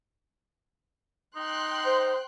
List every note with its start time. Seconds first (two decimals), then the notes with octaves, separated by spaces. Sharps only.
1.36 D#4 G5 C6 F#6
1.86 C5